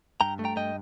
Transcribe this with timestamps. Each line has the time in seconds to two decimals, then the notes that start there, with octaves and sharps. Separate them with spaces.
0.21 G2 G5 A#5
0.39 A3
0.45 G5 A#5
0.56 G2 D#5 G5